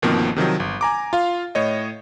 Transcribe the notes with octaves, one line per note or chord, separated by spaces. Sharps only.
G1 B2 D#3 F3 A#3 C4
C3 D#3 F3 F#3
G1
G#5 A#5 D6
F4 F5
A2 C#5 D#5